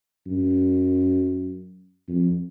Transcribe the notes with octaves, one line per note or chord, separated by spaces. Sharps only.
F#2
F2